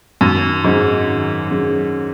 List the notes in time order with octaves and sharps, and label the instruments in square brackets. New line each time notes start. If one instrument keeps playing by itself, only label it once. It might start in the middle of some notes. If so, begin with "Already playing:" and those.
[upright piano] F#2 [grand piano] D#3
[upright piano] G#2 [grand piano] F#3 C#4 G#4
[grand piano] D#3
F#3 C#4 G#4